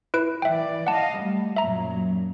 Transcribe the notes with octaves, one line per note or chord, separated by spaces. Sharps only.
E4 B4 D7
E3 D5 E5 G5
D#5 F5 F#5 A5
G3 A3
F#2 A#2 F#3 E5 A#5